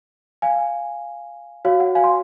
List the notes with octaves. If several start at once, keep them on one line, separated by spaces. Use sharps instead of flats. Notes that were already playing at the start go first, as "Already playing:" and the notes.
F5 G#5
F#4 C#5 F5
F#5
F5 G#5
C6